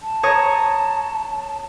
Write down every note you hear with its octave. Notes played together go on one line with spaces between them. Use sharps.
A5
C#5 A#5 D#6